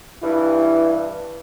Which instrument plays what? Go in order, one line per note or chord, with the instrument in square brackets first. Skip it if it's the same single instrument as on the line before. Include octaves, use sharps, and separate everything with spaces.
[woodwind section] G2 E3 [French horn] E4